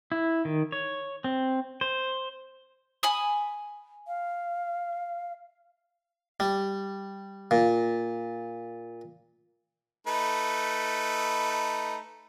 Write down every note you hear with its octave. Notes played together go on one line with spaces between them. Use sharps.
E4
D#3
C#5
C4
C5
G#5 B5 D#6
F5
G3
A#2
A3 D#4 B4